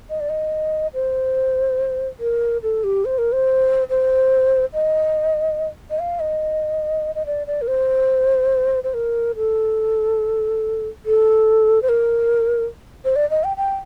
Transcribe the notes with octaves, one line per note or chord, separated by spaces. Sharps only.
D#5
D5
D#5
C5
A#4
A4
G4
C5
A#4
C5
C5
D#5
D#5
F5
D#5
D#5
D5
D5
A#4
C5
C5
A#4
A4
A4
C5
A#4
C5
D5
D#5
G5
G5